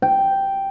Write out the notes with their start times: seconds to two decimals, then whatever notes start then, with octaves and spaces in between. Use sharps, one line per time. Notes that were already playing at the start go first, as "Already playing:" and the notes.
0.02 G5